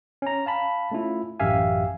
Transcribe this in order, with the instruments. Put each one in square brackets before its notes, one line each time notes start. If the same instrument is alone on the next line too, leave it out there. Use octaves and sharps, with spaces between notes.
[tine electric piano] C#4 A#5
F5 A5 B5
A3 C#4 E4 F4
A1 F#2 G4 E5 F5 G#5